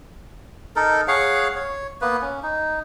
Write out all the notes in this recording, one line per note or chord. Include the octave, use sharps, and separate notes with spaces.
D#4 A4 A#4
G#4 C#5 F5 F#5
C#5
A#3 B3 B4
C#4
D#4